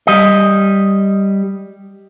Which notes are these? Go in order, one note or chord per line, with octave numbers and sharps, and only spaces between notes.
G3 D#5